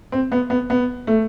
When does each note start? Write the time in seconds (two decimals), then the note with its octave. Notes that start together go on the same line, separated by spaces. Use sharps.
0.12 C4
0.32 B3
0.50 B3
0.70 B3
1.07 A3